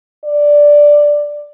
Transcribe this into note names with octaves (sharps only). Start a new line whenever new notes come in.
D5